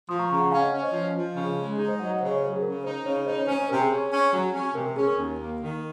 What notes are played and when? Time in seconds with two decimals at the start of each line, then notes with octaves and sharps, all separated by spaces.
0.08 F3 C6 D#6
0.19 A#5 C#6
0.30 C#3 A#5 C#6
0.40 F#5 A#5
0.51 C#4 F5 G#5
0.62 D#5 F#5
0.72 C#4
0.83 C5 D#5
0.93 F3
1.14 F3
1.36 C#3
1.57 G#3
1.78 D#4 G#4
1.88 C5 D#5
1.99 F#3 D#5 F#5
2.09 D#5 F#5
2.20 C#3 C5 D#5
2.31 C#5
2.41 F#3 C5
2.53 G#4
2.62 C#3 A#4
2.84 D#4 C5
3.05 C#3 C#5
3.26 D#4 C5 D#5
3.37 C#5
3.47 C#4 C5
3.58 C5
3.69 C3 A#4
3.80 G#4
3.91 C#4
4.11 C#4
4.32 F#3
4.53 C#4
4.74 C3 A#4
4.85 A#4
4.95 C#4 G#4
5.07 A#4
5.17 D#2
5.39 A#3
5.60 D#3